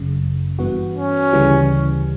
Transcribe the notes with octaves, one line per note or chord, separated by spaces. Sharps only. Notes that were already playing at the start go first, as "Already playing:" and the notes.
Already playing: G1 F#2 C#3
G2 E3 B3 F#4
C#4
D2 C#3 E3 G3